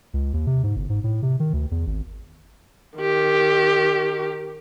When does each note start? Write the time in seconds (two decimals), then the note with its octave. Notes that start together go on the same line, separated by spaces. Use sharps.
0.14 C#2
0.33 D#2
0.47 C3
0.63 G#2
0.76 G1
0.90 G#2
1.04 A2
1.23 C3
1.40 D#3
1.53 D2
1.71 E2
1.87 G#1
2.98 D#3 G4